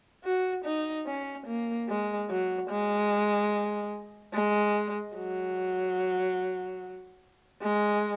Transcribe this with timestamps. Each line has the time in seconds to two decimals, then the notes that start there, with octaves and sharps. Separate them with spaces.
0.25 F#4
0.65 D#4
1.07 C#4
1.47 A#3
1.89 G#3
2.30 F#3
2.70 G#3
4.34 G#3
5.17 F#3
7.62 G#3